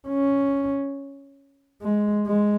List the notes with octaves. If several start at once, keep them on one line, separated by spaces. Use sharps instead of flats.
C#4
G#3
G#3